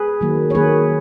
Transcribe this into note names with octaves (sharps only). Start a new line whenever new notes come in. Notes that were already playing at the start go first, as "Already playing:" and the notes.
Already playing: G#4 B4
D#3 F#3 A#3
C#5
D#3 F#3 A#3 G#4 B4